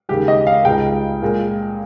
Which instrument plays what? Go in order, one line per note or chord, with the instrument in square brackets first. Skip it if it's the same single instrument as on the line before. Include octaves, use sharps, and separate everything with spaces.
[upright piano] D#2 C#3 G#3 G4
D#5
F5
C#2 C#3 G#3 G5
A#2 G#3